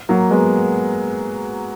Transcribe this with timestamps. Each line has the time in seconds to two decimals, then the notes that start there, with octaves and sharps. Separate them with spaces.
0.09 F#3 A#3
0.31 G#3 B3